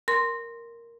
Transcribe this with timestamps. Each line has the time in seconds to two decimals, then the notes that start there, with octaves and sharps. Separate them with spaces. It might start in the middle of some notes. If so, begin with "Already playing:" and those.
0.08 A#4 C6